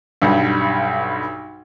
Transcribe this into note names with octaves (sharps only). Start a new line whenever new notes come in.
B1 G2